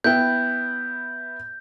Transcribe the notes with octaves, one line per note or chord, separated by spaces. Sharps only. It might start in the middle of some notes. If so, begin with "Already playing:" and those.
B3 E4 G5 G6